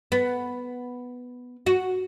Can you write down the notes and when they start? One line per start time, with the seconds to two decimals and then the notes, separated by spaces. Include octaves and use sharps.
0.12 B3
1.66 F#4